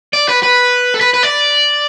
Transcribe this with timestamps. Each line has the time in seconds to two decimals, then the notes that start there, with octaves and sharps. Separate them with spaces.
0.13 D5
0.29 B4
0.43 B4
0.94 A4
1.01 B4
1.14 B4
1.23 D5